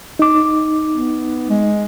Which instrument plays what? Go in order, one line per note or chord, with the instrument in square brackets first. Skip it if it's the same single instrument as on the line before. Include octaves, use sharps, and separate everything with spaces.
[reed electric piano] D#4 D6
[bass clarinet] B3
G#3